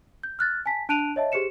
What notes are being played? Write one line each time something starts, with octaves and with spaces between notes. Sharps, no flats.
G6
F6 F#6 A6
G#5 A5 B6
D4 A5 F#6 D7 D#7 F7
C#5 D#5 E5 A5
G4 G#4 C5 C#7 E7